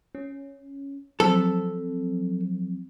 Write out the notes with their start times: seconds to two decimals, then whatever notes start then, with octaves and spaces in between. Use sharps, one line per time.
0.15 C#4
1.20 F3 F#3 C4 A4